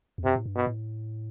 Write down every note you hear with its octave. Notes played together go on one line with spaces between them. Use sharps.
E2
F#2 C3
A2
G2
B2
A2